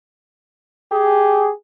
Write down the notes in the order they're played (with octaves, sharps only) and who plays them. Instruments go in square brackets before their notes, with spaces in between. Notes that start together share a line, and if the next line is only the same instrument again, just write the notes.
[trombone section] G4 G#4